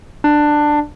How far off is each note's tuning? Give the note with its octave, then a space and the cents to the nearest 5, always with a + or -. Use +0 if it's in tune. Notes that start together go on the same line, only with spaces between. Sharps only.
D4 +15